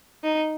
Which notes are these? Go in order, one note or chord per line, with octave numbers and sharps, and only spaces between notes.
D#4